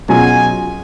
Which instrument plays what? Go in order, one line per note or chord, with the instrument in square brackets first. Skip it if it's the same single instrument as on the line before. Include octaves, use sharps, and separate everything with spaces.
[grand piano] B2 F#3 C#4 F4 G#4 [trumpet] G#5